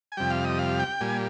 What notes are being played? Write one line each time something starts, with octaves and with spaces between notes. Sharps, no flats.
G#5
F2 C3 G3 G5
F5
D#5
F5
G5
A#2 G3 G#5